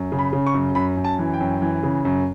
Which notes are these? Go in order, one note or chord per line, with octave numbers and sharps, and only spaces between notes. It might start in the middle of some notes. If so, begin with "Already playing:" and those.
Already playing: F#2
C#3
B5
C#3
C#6
F#2
F#2 B5
F#2
A5
E3
G5
F#2
E3
C#3
F#2